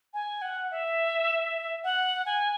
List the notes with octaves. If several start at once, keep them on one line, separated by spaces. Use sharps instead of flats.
G#5
F#5
E5
F#5
G#5